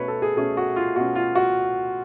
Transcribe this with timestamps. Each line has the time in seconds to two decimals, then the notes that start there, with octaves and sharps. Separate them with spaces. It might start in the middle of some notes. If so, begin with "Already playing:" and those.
Already playing: B2 A3 C#4 B4 C#5
0.08 A4
0.22 G#4
0.37 B2 A3 C#4 G#4
0.57 F#4
0.76 F4
0.96 B2 A3 C#4 F#4
1.16 F4
1.35 F#4